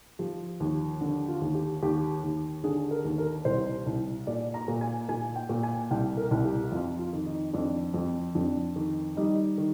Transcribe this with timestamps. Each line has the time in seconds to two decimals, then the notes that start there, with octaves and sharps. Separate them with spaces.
0.19 F3 G4
0.60 D#2
1.01 D3
1.28 F4
1.41 D#2
1.55 G4
1.82 D#2 G4
2.24 D#2
2.64 D3 G#4
2.91 A#4
3.05 D#2
3.18 A#4
3.45 C2 C5
3.86 C2
4.27 A#2 D5
4.54 A#5
4.68 A#2
4.81 G#5
5.09 A#2 G#5
5.36 G5
5.49 A#2
5.63 G#5
5.91 C2 G5
6.17 A#4
6.31 C2
6.45 G4
6.72 F2 F4
6.99 F4
7.13 D#3
7.26 D#4
7.53 F2 D4
7.94 F2
8.35 F2 D4
8.76 D#3
9.17 G3 D#4
9.58 D#3